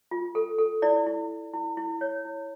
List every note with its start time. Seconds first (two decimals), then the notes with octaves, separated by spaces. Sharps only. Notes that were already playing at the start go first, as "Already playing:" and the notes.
0.11 F4
0.35 A4
0.58 A4
0.82 E4 D5
1.06 E4
1.30 E4
1.54 E4
1.77 E4
2.01 C#5
2.25 E4